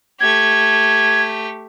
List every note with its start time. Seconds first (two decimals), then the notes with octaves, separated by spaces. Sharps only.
0.20 A3 G4 G#6